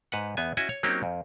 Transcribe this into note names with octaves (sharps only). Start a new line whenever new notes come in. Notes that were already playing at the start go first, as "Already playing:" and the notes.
G#2 B4 F#5
E2 B3 G#5
C#4 E4 F#4 D#5 G#5
C#5
F#3 A#3 C4 C#4 D#4 G4
F2